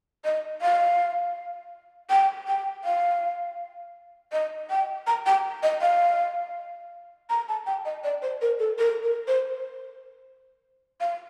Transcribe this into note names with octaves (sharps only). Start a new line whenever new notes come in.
D#5
F5
G5
G5
F5
D#5
G5
A#5
G5
D#5
F5
A#5
A5
G5
D#5
D5
C5
A#4
A4
A#4
A#4
C5
F5